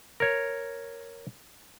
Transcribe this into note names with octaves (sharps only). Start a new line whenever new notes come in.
A#4 C#5